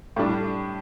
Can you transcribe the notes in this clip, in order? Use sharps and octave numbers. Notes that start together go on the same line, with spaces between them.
A2 G3 D4